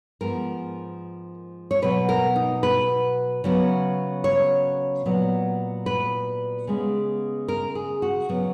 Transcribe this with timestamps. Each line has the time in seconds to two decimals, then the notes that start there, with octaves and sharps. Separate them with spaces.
0.21 G#2 F3 B3 A#4
1.71 C#5
1.82 B2 F#3 B3 B4
2.09 A#4
2.36 D#4
2.63 B4
3.44 C#3 F#3 B3
4.24 C#5
5.05 A#2 F#3 B3
5.86 B4
6.67 C#3 G#3 B3
7.48 A#4
7.75 G#4
8.02 F#4
8.29 C#3 F#3 B3